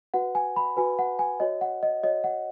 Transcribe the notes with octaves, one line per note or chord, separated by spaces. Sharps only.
F#4 B4 F#5
G#5
B5
F#4 B4 G#5
F#5
G#5
F#4 C#5 D#5
F#5
D#5
F#4 C#5 D#5
F#5